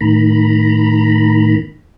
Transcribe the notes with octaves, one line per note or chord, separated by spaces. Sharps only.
A2 D#3 A#5 B5